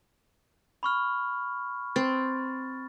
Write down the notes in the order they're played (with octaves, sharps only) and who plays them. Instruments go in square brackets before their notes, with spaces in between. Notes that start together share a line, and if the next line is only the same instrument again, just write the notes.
[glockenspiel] B5 C#6 F6
[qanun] C4 [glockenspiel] A6